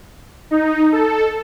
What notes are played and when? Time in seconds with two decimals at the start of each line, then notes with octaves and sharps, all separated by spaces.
0.51 D#4
0.92 A4